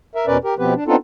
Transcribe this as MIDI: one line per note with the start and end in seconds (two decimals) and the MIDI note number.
0.15 0.26 70
0.15 0.26 76
0.27 0.37 40
0.27 0.37 47
0.27 0.37 61
0.27 0.37 70
0.27 0.37 71
0.27 0.37 74
0.44 0.54 67
0.44 0.54 70
0.59 0.74 47
0.59 0.74 53
0.59 0.74 59
0.59 0.74 60
0.59 0.74 67
0.59 0.74 71
0.75 0.84 62
0.87 0.96 59
0.87 0.96 60
0.87 0.96 62
0.87 0.96 63
0.87 0.96 65
0.87 0.96 69